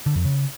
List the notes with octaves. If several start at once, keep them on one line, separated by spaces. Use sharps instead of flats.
D3
F2
C#3